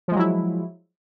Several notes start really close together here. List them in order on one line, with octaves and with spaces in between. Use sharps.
F3 G#3 F#3 E4